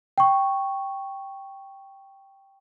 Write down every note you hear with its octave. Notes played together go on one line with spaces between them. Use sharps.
G5 C#6